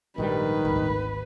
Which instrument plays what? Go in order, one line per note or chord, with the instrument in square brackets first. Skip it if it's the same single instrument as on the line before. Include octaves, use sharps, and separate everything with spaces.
[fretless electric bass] A#1 G#2 G3 [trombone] D#3 [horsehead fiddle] B4
[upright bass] G#1 D2